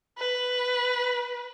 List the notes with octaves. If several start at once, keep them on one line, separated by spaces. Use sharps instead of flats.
B4